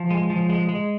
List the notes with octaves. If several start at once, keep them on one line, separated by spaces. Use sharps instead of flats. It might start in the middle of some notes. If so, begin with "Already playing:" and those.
Already playing: F3
G#3
F3
G#3
G#3